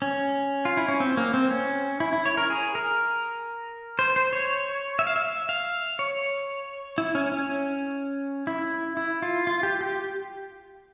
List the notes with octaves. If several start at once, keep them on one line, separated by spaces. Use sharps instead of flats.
C#4
F4
E4
C#4
C4
A#3
C4
C#4
E4
E4
C#5
A#4
G#4
A#4
C5
C5
C#5
E5
F5
E5
F5
C#5
E4
C#4
C#4
E4
E4
F4
F4
G4
G4